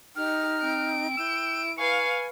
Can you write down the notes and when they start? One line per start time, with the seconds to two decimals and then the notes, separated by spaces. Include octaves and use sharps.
0.16 D#4 G4 F6
0.63 C4 D7
1.17 E4 G5 E6
1.78 B4 F5 G#5 C#6